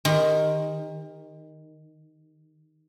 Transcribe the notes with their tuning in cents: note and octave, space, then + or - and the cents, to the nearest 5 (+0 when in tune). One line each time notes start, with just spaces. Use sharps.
D#3 +0 G4 +35 C5 -15